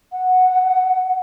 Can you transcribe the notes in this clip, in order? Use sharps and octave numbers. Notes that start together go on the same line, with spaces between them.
F#5